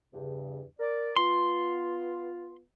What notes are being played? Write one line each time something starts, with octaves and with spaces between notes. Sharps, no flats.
E2 G2 C#3
A#4 D5
B3 F4 C6